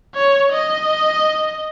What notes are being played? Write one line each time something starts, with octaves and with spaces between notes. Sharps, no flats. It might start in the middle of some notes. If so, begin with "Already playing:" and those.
C#5
D#5